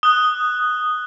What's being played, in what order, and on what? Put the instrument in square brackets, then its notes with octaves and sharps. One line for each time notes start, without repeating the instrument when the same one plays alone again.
[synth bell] D#6 [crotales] F#6 G7